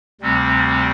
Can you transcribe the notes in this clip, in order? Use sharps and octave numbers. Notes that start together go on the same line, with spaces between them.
D2 C3 G3 C4